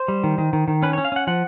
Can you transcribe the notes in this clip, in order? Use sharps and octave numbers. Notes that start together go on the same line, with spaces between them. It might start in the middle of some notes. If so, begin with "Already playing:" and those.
Already playing: C5
G3
D#3
D#3
D#3
D#3
C#4 B4
C#4 C#5
F5
C#4 F#5
F3 F#5